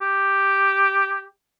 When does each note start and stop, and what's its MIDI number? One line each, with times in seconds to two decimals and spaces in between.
0.02 1.24 67